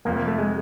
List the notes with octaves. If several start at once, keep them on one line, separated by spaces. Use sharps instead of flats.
F1 F2 C3 F3 A#3
A#3
A3
G#3